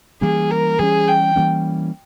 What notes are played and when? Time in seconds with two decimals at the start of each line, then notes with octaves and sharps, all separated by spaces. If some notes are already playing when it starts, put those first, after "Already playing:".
0.21 E3 G3 A#3 C#4 G#4
0.51 A#4
0.79 E3 G3 A#3 C#4 G#4
1.08 G5
1.36 E3 G3 A#3 C#4